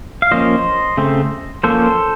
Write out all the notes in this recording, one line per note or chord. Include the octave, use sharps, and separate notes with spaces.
F5
F3 A#3 C#4 C5 D#5
C#3 A3 C4
F3 A#3 C#4 A4 C5